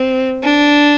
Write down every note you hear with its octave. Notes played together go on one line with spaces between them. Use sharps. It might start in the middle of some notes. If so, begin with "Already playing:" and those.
Already playing: C4
D4